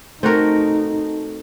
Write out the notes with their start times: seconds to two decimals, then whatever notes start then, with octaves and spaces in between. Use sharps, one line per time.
0.23 A3 C4 D#4 F#4 A#4